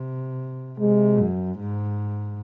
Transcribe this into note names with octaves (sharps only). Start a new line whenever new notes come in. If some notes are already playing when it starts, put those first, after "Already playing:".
Already playing: C3
C3 G#3
F#2
G#2